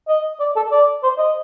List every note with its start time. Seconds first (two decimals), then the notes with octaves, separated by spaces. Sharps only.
0.08 D#5
0.40 D5
0.56 A4
0.72 D5
1.03 C5
1.18 D#5